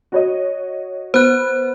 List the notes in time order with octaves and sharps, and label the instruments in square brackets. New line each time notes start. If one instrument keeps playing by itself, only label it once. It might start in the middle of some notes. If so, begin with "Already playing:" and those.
[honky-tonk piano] F#4 C#5 D#5
[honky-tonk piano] B3 [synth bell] C5 F#6